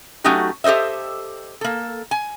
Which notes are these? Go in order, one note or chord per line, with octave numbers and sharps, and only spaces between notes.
F#3 A3 C#4 D#4 F#4 G4
G4 A4 C5 D#5 E5
A#3 A4
G#5